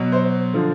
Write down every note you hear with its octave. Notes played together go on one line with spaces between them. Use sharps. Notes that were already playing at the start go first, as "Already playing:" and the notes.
Already playing: B2 F#3
C5
D3 F3